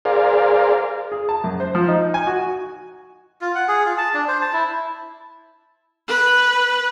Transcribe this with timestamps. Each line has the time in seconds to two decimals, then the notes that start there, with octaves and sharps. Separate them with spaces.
0.05 G#4 A#4 C5 D5 F5
1.12 G#4
1.29 A5
1.44 F#2
1.60 C5
1.75 F3
1.88 D#4
2.14 G#5
2.27 F#4
3.41 F4
3.55 F#5
3.68 G#4
3.86 F4
3.98 A5
4.14 D4
4.28 C5
4.41 A5
4.53 E4
6.08 B4